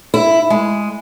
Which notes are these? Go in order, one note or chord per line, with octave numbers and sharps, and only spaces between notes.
E4
G#3